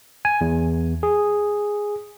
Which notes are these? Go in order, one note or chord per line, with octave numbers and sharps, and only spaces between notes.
G#5
E2
G#4